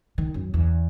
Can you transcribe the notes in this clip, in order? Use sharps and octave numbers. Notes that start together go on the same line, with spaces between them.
D#3
F#2
E2